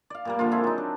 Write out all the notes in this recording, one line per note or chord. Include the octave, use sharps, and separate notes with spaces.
D5 F5
A#2 G3 A#3
D3 F3 F4
G#3 C4 E4 A4
F#3 D#4
D4